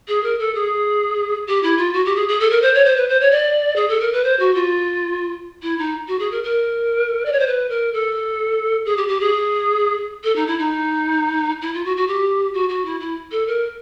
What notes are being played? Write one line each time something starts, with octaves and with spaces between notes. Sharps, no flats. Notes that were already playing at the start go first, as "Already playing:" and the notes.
G#4
A#4
A4
G#4
G4
E4
F4
F#4
G4
G#4
G#4
A4
A#4
C5
C#5
C5
B4
C5
C#5
D5
G#4
A4
A#4
B4
C5
F#4
F4
E4
D#4
F#4
G#4
A#4
A#4
D5
C#5
C5
B4
A#4
A4
G#4
G4
G4
G#4
A4
D#4
E4
D#4
E4
F4
F#4
F#4
G4
F#4
F#4
E4
E4
A4
A#4